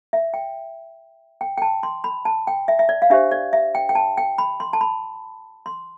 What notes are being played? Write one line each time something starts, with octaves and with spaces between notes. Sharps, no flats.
E5
G5
G5
G5
A5
C6
B5
A5
G5
E5
E5
D5
F5
D4 G4 C5 E5
D5
E5
G5
G5
A5
G5
B5
C6
A5
B5
C6